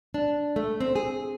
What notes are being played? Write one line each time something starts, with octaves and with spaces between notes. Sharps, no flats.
D4
A3
C4
G#4